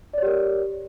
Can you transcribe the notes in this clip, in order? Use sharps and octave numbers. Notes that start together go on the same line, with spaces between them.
G4 A#4 C#5 D5